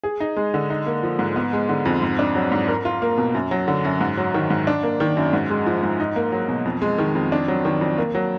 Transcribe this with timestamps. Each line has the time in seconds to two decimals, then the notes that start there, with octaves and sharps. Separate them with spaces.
0.04 G#4
0.20 D#4
0.37 G#3
0.54 D3
0.70 D#4
0.87 A#3
1.03 F3
1.19 G#2
1.36 B3
1.53 G#3
1.69 D3
1.85 F2
2.02 G#2
2.19 D4
2.35 F#3
2.52 G#2
2.68 A#4
2.85 F4
3.02 A#3
3.18 B2
3.34 F#2
3.51 F#3
3.68 D3
3.85 F#2
4.01 G#2
4.18 F#3
4.34 D#3
4.50 G#2
4.67 D4
4.83 A#3
5.00 D#3
5.17 F#2
5.33 G#2
5.50 G#3
5.66 F3
5.83 G#2
6.00 D#4
6.16 A#3
6.32 F#3
6.48 B2
6.65 F2
6.82 G#3
6.98 D#3
7.15 F2
7.32 D4
7.48 F#3
7.65 D#3
7.81 F2
7.98 A#3
8.15 F#3